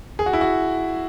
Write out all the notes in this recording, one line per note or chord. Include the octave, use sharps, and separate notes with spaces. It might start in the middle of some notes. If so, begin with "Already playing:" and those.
G#4
F#4
E4
F#4